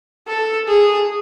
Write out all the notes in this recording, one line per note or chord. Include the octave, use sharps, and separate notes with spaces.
A4
G#4